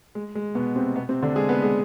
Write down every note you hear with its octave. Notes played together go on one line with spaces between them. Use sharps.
G#3
G#3
B2 B3
C3 C4
B2 B3
C3 C4
D3 D4
G#3 G#4
B3 B4
G#3 G#4